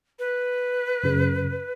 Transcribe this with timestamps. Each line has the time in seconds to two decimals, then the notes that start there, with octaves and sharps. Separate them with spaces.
0.19 B4
1.03 F#2 C#3